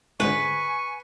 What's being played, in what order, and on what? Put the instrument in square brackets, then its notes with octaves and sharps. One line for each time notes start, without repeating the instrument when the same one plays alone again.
[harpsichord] C#2 G#2 D3 [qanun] B4 [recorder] G#5 [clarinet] C#6